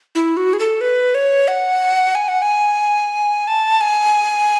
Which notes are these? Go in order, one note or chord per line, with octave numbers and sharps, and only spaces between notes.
E4
F#4
G#4
A4
B4
C#5
F#5
G#5
F#5
G#5
A5
G#5